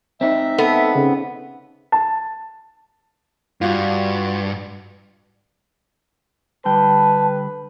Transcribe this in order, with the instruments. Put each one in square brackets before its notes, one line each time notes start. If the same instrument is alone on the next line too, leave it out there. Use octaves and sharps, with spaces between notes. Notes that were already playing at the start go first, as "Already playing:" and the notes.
[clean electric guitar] C4 D#4 [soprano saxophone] E5
[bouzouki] B3 [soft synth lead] A4
[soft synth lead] C#3
[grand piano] A5
[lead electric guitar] G2 [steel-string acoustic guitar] F4 F#4
[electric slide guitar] D3 G3 G5 [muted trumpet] B4 [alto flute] A5